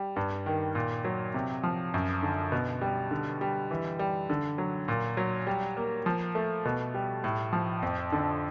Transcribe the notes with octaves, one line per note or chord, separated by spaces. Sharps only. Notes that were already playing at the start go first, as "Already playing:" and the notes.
Already playing: G3
G2
D#3
A#2
F#3
C3
F3
F#2
D3
B2
G3
D3
G3
E3
G3
D3
F#3
A#2
F#3
G3
A#3
F3
A3
B2
G3
A2
F3
F2
D3